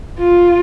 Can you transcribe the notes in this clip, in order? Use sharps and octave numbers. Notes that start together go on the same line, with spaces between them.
F4